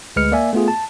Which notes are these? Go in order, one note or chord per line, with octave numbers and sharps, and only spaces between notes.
D2 G#3 B4 F6 C#7
A#3 D5 E5 G#5
A3 B3 F4 G#4
A5